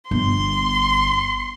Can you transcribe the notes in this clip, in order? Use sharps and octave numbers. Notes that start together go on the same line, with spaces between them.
G1 C6